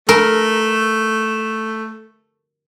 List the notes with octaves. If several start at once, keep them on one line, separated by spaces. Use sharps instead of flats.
A3 A#4